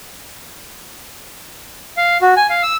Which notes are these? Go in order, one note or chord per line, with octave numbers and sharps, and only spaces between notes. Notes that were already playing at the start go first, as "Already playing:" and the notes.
F5
F#4
G#5
F5
E6